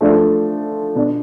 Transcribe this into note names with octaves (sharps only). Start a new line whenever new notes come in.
F3 A3 D4 F4 A4
B2 B3 D4